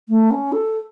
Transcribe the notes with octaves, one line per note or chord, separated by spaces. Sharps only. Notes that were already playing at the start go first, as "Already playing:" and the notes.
A3
C#4
A4